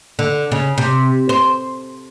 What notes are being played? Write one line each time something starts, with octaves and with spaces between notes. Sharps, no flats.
D3
C#3
C3
C5